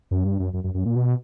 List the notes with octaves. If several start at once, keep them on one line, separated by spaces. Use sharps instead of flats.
F#2
G2
F#2
F#2
F#2
F#2
A#2
B2